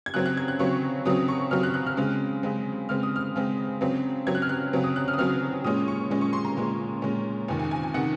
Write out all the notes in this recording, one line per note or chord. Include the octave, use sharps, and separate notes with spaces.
G#6
C#3 F#3 C4 F#6
F#6
G#6
F#6
C#3 F#3 C4 C#6
C#3 F#3 C4 D#6
C#6
C#3 F#3 C4 F6
F#6
F#6
F6
C#3 G#3 C4
C#3 G#3 C4
C#3 G#3 C4 F6
D#6
F6
C#3 G#3 C4
C#3 F#3 C4
C#3 F#3 C4 G#6
F#6
F6
F#6
C#3 F#3 C4
D#6
F#6
F6
D#6
C#3 F#3 C4 F6
A#2 G#3 C#4 D#6
C#6
A#2 G#3 C#4
C#6
C6
A#5
A#2 G#3 C#4
A#2 G#3 C#4
F2 C3 D#3 G#5
G#5
G#5
G#5
C3 D#3 F#5